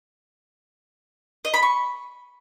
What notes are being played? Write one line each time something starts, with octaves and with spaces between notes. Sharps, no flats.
D#5
B5
C#6